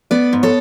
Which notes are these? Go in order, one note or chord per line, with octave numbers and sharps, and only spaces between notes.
B3 B4 D5
G#2
A4 C#5